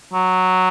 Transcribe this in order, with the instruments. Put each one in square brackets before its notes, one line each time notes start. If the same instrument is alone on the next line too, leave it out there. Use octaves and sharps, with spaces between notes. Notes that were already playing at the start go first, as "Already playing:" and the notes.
[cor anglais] F#3